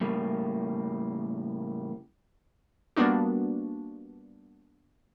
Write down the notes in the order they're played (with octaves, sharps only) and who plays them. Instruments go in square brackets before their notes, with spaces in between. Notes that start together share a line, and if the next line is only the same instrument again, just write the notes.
[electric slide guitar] A2 C#3 G3 A#3
[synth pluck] G3 A#3 B3 D4 F#4